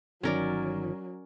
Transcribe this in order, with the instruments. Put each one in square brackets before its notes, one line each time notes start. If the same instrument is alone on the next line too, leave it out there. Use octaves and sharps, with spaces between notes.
[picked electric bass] G1 D#3 [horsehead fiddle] F#3 [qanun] C#4 A#4 D5